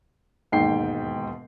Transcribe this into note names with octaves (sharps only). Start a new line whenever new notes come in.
E1 D#2 G#2 G5 C7